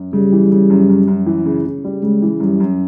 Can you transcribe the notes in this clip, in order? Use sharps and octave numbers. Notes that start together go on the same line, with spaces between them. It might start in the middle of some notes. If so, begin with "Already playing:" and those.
Already playing: F#2
C#3 G3
E3
C#3
F#2
F#2
F#2
E3
C#3
C#3
G3
C#3 G#3
E3
F#2 G3
F#2